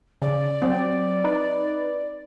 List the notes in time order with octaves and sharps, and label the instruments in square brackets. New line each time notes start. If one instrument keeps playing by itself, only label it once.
[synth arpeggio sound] C#3 [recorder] D5
[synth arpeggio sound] F#3 [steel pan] C4
[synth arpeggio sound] D#4 B4